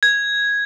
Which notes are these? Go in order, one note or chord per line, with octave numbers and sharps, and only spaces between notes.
G#6